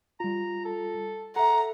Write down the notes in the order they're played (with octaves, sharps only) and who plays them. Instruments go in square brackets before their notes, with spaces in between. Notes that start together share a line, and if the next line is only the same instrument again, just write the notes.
[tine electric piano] G3 F4 [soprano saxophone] A#5
[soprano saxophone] A4
[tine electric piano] A4 E5 [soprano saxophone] F#5 [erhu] A#5